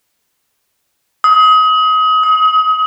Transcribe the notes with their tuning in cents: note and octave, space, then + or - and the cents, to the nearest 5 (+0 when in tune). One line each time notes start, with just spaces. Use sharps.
D#6 +30
D#6 +40